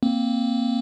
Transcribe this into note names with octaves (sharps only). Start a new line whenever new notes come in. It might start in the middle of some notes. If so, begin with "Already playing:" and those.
A#3 C4